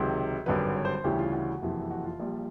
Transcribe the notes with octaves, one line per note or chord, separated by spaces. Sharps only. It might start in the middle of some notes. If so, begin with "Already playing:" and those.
Already playing: C#2 C3 D#3 F#3
G#1 G2 D3 F#3 B4
C#5
C5
C5
D2 C#3 E3 G3 G4
F4
F#4
F#1 F2 C3 E3
F#4
F4
A#1 A#2 G3